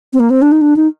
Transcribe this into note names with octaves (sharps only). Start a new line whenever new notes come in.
C4
A#3
C4
D4
D#4
D4
D#4